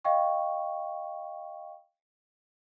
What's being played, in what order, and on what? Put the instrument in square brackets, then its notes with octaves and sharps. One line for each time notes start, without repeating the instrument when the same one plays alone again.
[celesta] D#5 F5 G5 C#6